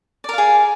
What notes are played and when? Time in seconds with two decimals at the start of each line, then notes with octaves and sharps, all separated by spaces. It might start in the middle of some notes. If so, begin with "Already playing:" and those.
0.24 D5
0.29 A#4
0.33 F5
0.38 G#4